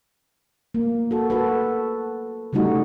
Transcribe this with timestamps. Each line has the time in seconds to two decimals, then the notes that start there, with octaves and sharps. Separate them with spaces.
0.74 A#3
1.11 F#4 A4
1.30 F#4 A4 B4
2.53 C#3 G3 A3 D#4 F#4